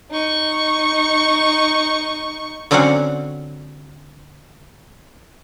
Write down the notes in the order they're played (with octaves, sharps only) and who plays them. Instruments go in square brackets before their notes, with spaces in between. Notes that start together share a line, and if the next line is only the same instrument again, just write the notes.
[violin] D#4 C#6
[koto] D3 F#3 C4 C#4 C#5 F#5